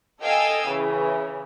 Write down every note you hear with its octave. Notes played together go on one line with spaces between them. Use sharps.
A4 D#5 F5 G5 G#5 E6
C#3 E3